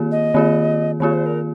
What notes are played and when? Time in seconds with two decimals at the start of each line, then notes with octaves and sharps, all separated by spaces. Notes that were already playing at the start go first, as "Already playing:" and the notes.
Already playing: D#3 A#3 F4 G#4
0.11 D#5
0.34 D#3 A#3 F4 G#4
1.00 D#3 A#3 F4 G#4 C#5
1.13 C5
1.26 A#4